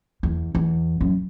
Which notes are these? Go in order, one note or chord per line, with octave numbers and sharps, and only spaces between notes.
E2
E2
F#2